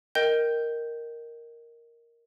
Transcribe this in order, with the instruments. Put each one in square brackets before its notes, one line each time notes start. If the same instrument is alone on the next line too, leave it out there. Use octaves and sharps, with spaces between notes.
[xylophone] A#4 D#5 G5 G6